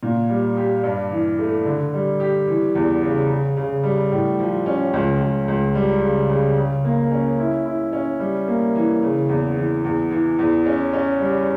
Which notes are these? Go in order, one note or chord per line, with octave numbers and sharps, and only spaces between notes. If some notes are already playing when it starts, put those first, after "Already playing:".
A#2
G3
G4
G2
E3
A3
D3
G3
G4
E3
E2
C#3
C#3
C#3
G3
A2
F3
C#4
C#2
C#2
C#2
G3
C#3
C#3
C#3
A#3
C#4
E4
E4
C#4
G3
A#3
E3
C#3
E2
E3
E2
E3
E2
C#4
C#4
G3